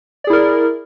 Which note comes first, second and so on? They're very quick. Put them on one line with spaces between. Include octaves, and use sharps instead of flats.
D5 G#4 E4 A#4